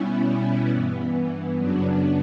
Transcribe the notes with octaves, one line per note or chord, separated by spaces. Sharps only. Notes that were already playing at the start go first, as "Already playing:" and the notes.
Already playing: B2 G3 B3 C#4 E4
G2 E3 B3
F#2 C#3 F#3 B3 D4